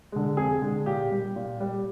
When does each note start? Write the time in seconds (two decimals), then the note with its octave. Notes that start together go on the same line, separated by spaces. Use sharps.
0.12 D3 G#3
0.37 F2 G#4
0.62 D3 G#3
0.86 A#2 G4
1.11 G3
1.36 A#2
1.61 G3